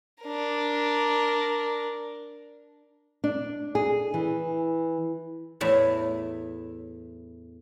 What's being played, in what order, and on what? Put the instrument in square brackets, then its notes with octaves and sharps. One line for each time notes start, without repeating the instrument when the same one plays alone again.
[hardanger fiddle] D4 A#4
[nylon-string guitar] D4
G#4
E3
[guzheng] E2 A2 E5